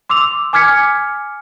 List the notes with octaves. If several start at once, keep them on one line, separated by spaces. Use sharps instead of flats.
C6 D6 E6 F7
G#5 D6 F6 G#6 B6 C#7